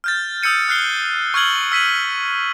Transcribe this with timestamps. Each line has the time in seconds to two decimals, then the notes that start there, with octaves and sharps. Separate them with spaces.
0.04 F6 G6 A6
0.43 D#6 E6 G6 C#7 D#7
0.68 F6 F#6 C7 G7
1.34 C#6 F6 G#6 F#7 G7
1.72 E6 B6 D#7 F#7